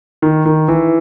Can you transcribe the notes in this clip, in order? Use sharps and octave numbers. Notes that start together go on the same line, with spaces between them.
D#3
D#3
E3